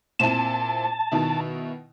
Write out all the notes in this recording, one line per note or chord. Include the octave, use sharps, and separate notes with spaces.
A#2 C4 E4 A5
B2 D#3 E4